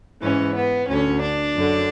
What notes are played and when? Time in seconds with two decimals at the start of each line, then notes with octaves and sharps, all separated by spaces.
0.22 G#2 E3 C#4
0.55 B3
0.88 D2 D3 C#4
1.22 D4
1.55 F#2 D3